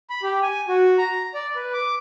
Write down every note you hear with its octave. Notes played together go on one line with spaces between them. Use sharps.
B5
G4
G#5
F#4
A#5
D5
B4
D6